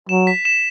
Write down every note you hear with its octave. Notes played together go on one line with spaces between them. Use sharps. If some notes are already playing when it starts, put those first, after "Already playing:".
F#3 E7
B6
E7